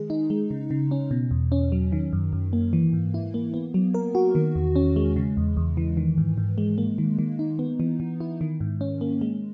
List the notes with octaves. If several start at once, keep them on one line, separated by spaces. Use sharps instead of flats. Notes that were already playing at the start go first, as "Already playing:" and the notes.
Already playing: D#3 G#3 G#4
D#4
G#3
C#3
C#3
C#4
B2
E2
C#4
F#3
D#3
F#2
F#2
A#3
E3
G#2
E4
A#3
B3
F#3
A#4
F#4
D#3
E2
C#4
G#3
C#3
E2
E2
E3
D#3
G#2
G#2
G#3
A#3
D#3
D#3
D#4
B3
E3
E3
E4
D#3
G#2
C#4
A#3
G#3